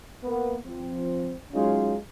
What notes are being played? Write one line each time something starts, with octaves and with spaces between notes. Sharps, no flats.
A#3 B3
F3 C4
F#3 G#3 C#4 D#4 F4